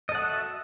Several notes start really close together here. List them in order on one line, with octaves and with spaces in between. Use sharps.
D#5 A4 F#5 F#4 E5